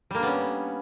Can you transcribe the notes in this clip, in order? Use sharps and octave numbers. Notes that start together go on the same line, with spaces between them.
G3 A#3 B3 C#4 D4